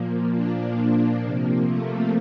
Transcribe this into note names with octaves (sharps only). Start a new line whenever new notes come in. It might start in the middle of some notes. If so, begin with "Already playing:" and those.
Already playing: A#2 F3 A#3
D4
C3 F3 A#3
A3